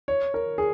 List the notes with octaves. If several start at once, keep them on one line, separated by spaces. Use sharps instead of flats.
C#5
A#4
G#4